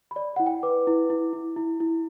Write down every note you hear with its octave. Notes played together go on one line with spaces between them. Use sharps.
B5
D5
E4 F#5
G5
B4 D6
E4
E4
E4
E4
E4